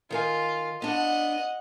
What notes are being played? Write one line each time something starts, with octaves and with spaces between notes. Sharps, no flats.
D#3 F4 A#4 G#5
B3 D4 D#5 F#5